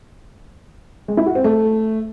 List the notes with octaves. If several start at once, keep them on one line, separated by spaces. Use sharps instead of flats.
G#3
E4
F#4
C4
A3